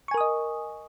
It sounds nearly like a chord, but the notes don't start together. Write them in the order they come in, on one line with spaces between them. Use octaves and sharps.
C#6 G#5 A#4 D#6 D#5